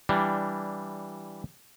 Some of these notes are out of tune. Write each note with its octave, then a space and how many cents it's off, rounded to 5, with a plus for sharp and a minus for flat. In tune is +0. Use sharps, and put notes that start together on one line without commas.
E3 +0 G3 +0 D4 -5